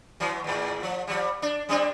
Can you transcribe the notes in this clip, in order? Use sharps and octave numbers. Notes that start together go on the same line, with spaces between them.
E3 F#3
E2 A2
F3
F3 G3
D4
G3 C4 D4